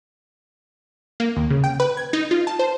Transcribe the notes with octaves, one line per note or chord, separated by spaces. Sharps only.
A#3
D#2
C#3
G5
B4
G#6
D#4
F4
A5
C5